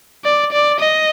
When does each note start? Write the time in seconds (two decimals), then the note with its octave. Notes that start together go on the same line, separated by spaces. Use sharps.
0.25 D5
0.52 D5
0.81 D#5